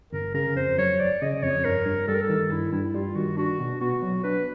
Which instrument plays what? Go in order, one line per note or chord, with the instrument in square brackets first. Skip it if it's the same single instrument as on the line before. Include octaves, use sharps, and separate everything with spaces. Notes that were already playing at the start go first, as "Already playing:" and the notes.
[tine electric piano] G1 [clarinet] A#4
[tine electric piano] C#3 [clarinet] A#4
[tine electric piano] F2 [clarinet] C5
[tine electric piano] F#3 [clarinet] C#5
[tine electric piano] G1 [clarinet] D5
[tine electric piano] C#3 [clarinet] D#5
[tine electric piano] F2 [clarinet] C#5
[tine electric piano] G2 [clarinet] A#4
[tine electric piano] G2
[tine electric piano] G3 [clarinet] A4
[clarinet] A#4
A4
[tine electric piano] D#3
[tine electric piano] G2 [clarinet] E4
[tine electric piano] G2 [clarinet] E4
[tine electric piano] G3 [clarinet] F4
[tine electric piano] D#3 [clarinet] F#4
[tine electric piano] D4 [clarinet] F#4
[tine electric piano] B2
[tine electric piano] B3 [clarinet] F#4
[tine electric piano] F#3
[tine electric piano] D4 [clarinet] B4